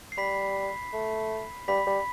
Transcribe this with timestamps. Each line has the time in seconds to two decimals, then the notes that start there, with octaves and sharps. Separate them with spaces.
0.12 C7
0.18 G3 B5 B6
0.93 A3
1.68 G3 B5 B6
1.87 G3